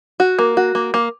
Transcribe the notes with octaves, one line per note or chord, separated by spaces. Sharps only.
F#4
A#3
F#4
A#3
A#3